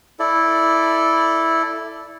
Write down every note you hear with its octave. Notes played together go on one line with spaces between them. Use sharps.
E4 A4 D5